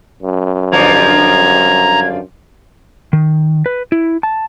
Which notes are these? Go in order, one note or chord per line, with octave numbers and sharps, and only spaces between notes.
F#2
G2 D3 F3 A#5 G#6
D#3
B4
E4
A5